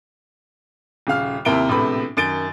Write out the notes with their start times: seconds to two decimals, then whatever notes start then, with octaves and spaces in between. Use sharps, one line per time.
1.07 D#1 C#3 F5 F6
1.45 D#2 C3 E4 A#4 D7 G7
1.69 A#1 A2 C3 B3 B5
2.17 F#2 D#3 A6 D7 G7